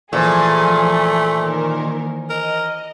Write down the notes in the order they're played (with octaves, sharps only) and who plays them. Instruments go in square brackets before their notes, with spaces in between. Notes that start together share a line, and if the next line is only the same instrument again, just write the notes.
[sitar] A#2 [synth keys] E3 C5 G#5 [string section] F3 G#4 [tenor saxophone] A3
[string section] D#3 A#3 A#4
[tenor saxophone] A#4 [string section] D#5